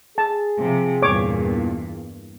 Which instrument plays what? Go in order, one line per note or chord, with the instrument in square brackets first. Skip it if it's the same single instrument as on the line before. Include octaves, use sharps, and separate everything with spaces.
[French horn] G#4 [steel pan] A5
[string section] C3 F3
[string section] E2 G2 A#2 [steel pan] C#5 D6